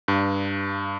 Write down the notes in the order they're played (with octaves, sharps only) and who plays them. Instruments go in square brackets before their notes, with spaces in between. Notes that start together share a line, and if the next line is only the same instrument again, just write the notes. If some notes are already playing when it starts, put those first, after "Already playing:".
[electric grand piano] G2